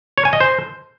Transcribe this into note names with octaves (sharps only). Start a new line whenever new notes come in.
C#5
G#5
D#5
C5